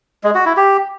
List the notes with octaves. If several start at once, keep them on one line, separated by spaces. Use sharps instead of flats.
G#3
F#4
E4
G4